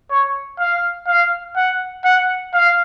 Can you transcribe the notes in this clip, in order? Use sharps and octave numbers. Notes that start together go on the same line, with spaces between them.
C#5
F5
F5
F#5
F#5
F5